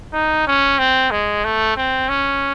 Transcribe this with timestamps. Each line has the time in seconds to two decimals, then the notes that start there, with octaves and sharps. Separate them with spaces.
0.13 D#4
0.47 C#4
0.79 C4
1.11 G#3
1.44 A3
1.77 C4
2.09 C#4